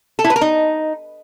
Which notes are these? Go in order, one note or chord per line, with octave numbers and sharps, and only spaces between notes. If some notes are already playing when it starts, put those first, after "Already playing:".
A4
E4
B4
A#4
D#4